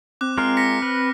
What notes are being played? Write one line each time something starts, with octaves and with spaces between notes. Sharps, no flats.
C4 D6 F#6
G#3 F4 A#4 F6
A#6 B6 C#7
B4